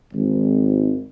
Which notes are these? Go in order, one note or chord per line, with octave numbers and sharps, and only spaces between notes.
G#1